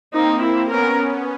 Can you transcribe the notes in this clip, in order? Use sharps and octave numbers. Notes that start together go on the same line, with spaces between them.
A#3 C4 D#4
E4
B3 C#4 A#4